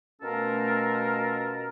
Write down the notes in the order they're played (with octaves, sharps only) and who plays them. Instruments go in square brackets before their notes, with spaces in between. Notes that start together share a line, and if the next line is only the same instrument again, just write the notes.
[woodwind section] B2 A3 C#4 F4 A4 A#4